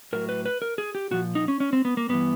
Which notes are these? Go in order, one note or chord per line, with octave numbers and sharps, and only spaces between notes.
A2 F#3 A#4
B4
B4
A#4
G#4
G4
A#2 F3 F#4
D#4
C#4
C#4
C4
B3
A#3
G2 E3 B3